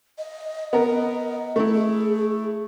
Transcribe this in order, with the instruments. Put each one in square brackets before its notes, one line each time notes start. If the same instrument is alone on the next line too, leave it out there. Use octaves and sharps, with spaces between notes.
[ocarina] D#5
[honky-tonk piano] B3 A#4
A3 E4
[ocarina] G#4